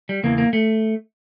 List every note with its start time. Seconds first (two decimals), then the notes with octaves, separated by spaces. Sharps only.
0.09 G3
0.23 E2 C#3 E3 A#3
0.38 A#3
0.53 A3